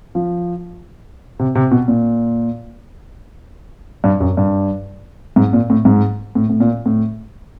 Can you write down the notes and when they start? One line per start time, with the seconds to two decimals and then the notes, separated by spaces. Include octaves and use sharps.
0.15 F3
1.39 C3
1.55 C3
1.71 B2
1.88 A#2
4.04 G2
4.20 F#2
4.37 G2
5.36 G#2
5.53 A#2
5.70 A2
5.85 G#2
6.35 A2
6.49 A2
6.60 A#2
6.86 A2